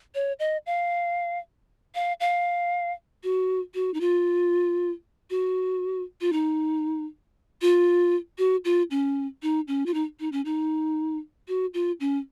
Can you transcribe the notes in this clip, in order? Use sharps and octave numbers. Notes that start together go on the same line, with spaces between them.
C#5
D#5
F5
F5
F5
F#4
F#4
D#4
F4
F#4
F4
D#4
F4
F#4
F4
C#4
D#4
C#4
F4
D#4
D#4
C#4
D#4
F#4
F4
C#4